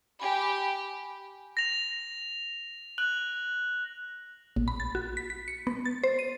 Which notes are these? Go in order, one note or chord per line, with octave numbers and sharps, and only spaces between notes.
G4 G#5 B5
A#6 F7
F#6 F#7
A#1
B5
A6
F#4
B6
B6
C#7
B3
A6
C5
D#7